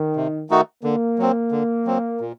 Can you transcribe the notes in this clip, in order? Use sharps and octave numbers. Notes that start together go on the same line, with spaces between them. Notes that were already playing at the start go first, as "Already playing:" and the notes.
Already playing: D#3
C3
D#3 A3 D#4 F#4
D3 A#3
F#3 C4
D3
F#3 C4
A#2